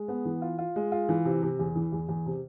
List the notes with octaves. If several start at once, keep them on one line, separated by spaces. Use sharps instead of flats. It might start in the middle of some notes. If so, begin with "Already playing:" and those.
Already playing: G#3
B3
E3
F4
F4
G#3
F4
E3
C3
C3
E2
E3
E2
E2
C3